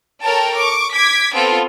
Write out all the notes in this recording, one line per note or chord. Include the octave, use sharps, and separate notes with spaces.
A4 A#4 C#5 G5 A5
C#6 D6
D6 G#6 B6
B3 C4 F4 A4 G5